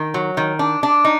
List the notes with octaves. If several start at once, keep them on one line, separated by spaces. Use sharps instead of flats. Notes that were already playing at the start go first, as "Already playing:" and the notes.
Already playing: D#3
F#3
D#3
D4
D4
D#4